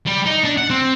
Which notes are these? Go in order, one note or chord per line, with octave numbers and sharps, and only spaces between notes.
G3
D#4
D4
F#5
C4